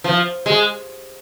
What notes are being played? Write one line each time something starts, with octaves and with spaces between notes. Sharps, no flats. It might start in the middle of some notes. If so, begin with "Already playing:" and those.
F3
G#3